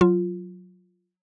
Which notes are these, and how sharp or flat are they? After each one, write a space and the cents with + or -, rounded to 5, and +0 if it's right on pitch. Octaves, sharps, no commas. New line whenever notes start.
F#3 -15 F4 +0